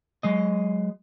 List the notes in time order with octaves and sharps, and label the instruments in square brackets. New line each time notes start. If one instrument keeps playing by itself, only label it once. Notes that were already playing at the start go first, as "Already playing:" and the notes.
[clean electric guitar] F#3 G#3 D#5